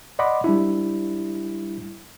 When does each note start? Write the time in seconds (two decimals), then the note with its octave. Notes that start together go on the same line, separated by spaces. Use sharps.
0.19 D5 D#5 F#5 B5 C6 D6
0.44 G3 D4 E4